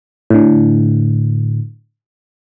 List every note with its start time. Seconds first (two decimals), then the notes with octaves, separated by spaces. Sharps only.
0.30 A2 D3